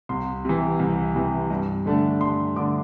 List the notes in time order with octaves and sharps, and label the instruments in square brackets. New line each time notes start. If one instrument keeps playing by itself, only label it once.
[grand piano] C2 C6
C3 E3
C2
C3 E3
G2
D3 A3 D4
G2 C6
D3 A3 D4 D6